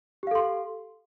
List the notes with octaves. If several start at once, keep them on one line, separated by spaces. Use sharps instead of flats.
G4 A4 F5 C6